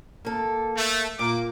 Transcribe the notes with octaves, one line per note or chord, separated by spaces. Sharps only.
A#3 A4
A3
A#2 A#3 D6